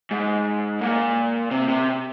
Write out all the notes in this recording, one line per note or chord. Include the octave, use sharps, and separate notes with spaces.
G#2
A#2
C3
C3